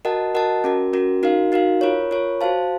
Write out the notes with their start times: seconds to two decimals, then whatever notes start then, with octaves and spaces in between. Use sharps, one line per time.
0.05 F#4 A#4 D#5 F#5 A5
0.35 F#4 A#4 D#5 F#5 A5
0.64 C#4 F#4 A#4
0.93 C#4 F#4 A#4
1.23 D#4 F#4 A#4 F5
1.52 D#4 F#4 A#4 F5
1.81 F4 A#4 C#5
2.11 F4 A#4 C#5
2.41 F#4 C5 F5 A5